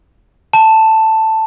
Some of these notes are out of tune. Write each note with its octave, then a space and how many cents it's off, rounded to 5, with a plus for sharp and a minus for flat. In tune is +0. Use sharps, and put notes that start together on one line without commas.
A5 +5